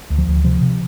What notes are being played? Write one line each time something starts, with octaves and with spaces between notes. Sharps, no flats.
D2
F3
D2
C3 F3
C3